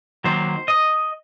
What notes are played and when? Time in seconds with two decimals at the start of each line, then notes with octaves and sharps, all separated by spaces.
0.24 D#3 F#3 A#3 C5
0.68 D#5